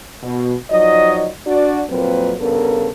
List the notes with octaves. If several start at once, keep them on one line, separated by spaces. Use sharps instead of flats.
B2
F3 F#3 D#4 D5 D#5
D4 F#4 D5
F2 A#2 F#3 A#3 C4 B4
G2 C#3 B3 A4 A#4